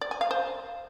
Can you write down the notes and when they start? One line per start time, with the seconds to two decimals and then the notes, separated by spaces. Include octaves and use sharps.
0.01 D5
0.11 G#5
0.21 F5
0.31 C5